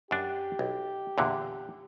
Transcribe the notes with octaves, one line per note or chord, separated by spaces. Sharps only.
F#2 D4 G4
B1
E2 A#2 D3